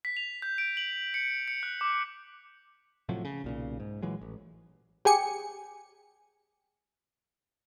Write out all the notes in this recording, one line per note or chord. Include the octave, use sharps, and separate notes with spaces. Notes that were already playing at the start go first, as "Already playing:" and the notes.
B6
F7
G6
D7
F#7
C#7
C#7
F#6
D6
A2 C3 F3 F#3
C#3
B1 A#2 C#3
G#2
A#2 E3 F#3 G#3
A1
G4 G#4 G#5 C#7